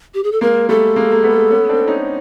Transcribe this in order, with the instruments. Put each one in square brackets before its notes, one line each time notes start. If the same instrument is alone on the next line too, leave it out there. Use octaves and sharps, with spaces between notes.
[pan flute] G4
G#4
A4
[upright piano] G#3 A#3 [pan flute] A#4
[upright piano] G3 A3 [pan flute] A4
[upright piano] G#3 A#3
A#3
A3 B3
B3 C#4
C4 D4
C#4 D#4